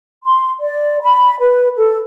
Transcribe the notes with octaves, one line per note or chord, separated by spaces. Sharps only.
C6
D5
B5
B4
A4